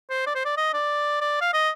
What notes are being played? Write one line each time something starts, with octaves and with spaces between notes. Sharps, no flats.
C5
D5
C5
D5
D#5
D5
D5
F5
D#5